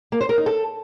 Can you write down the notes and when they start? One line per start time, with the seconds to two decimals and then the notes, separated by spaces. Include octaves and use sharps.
0.12 A#3
0.21 C5
0.29 A#4
0.38 D#4
0.46 A4